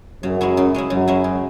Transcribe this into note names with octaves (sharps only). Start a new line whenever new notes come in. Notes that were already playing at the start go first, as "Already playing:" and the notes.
F#2 C#3 F#3
G#3 C#4 E4
C#3
G#3 C#4 E4
F#2 C#3 F#3
G#3 C#4 E4
C#3